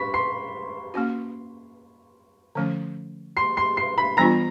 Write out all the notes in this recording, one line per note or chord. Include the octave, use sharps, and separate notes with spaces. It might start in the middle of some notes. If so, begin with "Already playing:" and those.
Already playing: B5 C#6 B6
C6 C7
A#3 C#4 F#4
D3 F3 A3 C#4
C6 C7
C6 C7
C6 C7
B5 B6
E3 G3 B3 D4 F4 A#5 A#6